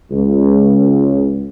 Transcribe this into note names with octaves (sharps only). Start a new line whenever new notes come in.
C#2